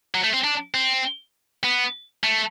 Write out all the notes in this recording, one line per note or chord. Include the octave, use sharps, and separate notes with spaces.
F#3
A3
C4
D4
C4
B3
A3